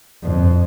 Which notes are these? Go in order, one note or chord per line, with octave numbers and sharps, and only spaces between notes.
F2